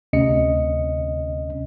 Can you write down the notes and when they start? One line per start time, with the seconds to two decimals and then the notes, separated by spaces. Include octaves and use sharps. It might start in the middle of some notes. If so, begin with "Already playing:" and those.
0.13 D2 C3 C#4 D#5 C#7